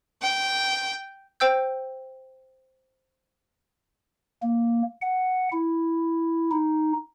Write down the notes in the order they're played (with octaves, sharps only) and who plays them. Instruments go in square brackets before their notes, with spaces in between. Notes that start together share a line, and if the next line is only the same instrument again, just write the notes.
[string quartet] G5
[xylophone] C5 G5 E6 G6
[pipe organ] A#3
F#5
E4
D#4